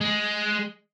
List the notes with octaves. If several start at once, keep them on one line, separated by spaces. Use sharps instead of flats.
G#3